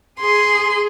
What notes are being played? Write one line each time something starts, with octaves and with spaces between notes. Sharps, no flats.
G#4 C6